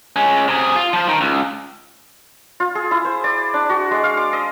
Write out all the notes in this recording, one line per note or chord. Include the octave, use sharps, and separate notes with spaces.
G#3 C#4
C3 G#4
F4
F3 C5
D#3
C#2
F4
G#4
E4
C5
D5
D4
F#4
G#3
F5
D6
D#5